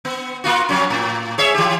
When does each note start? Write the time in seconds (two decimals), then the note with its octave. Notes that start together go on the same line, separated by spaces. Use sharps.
0.05 B3
0.44 A#3 F4 F#4
0.69 F2 F#3 C#4
0.90 A2
1.38 G#4 C#5 E5
1.55 E3 G4